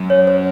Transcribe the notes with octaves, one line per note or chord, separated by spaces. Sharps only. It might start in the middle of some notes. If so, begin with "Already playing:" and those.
Already playing: F#2
C#5
C5